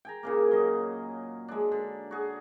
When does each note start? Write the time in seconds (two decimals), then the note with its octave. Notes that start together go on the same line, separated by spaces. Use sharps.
0.05 G5 G#5 A#5
0.23 A#2 C#3 A#3
0.51 F#3 D#5
1.48 G#3 D4
1.72 D3
2.11 F#4 G#4